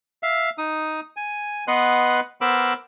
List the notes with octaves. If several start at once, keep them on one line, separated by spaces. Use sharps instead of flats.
E5 F5
D#4 D#6
G#5
B3 B4 D#5 F#5 C6 F#6
B3 A#4 C5 B5 D6 E6